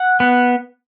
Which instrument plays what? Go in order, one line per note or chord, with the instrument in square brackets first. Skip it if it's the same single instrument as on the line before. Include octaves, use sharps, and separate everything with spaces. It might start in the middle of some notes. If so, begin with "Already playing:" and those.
Already playing: [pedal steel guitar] F#5
B3